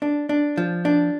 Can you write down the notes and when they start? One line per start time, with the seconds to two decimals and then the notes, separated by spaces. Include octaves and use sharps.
0.02 D4
0.29 D4
0.57 F3
0.85 D4